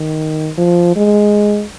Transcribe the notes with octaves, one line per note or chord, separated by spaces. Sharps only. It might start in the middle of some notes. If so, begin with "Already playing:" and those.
Already playing: D#3
F3
G#3